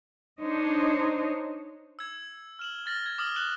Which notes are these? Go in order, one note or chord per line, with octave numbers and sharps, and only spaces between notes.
D4 D#4 C5 C#5 D#5
E6 G#6
F6 E7 F#7
F6 A6 A#6 F#7
G#6
D6 D#6 F6 A#6 F#7 G7
D6 F#6 E7 F#7 G7